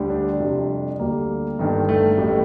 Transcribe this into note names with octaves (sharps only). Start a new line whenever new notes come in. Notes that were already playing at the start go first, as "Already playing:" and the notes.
Already playing: D2 D3 G3
D4
F2 C3 G3
D2 D3 G3 A#3
G1 G2 D#3
A3
A1 A2 G3